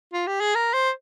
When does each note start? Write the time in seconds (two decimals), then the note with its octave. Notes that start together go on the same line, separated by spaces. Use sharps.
0.13 F4
0.27 G4
0.41 G#4
0.55 A#4
0.73 C5